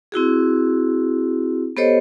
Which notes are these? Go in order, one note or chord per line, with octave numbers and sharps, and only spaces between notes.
C4 E4 F#4 G#4
B3 G4 A4 C5 C#5 D#5